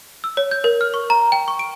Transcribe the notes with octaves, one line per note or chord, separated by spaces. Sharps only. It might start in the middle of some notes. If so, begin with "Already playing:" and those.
E6
C#5
G6
A#4
F6
C#6
A#5
G5
C#6
D7